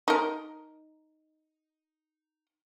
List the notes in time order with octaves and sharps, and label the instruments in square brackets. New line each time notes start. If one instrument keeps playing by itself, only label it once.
[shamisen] D#4 A#4